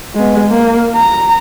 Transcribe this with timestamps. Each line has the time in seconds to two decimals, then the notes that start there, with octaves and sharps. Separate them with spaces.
0.15 G#3 B3
0.48 A#3
0.95 A#5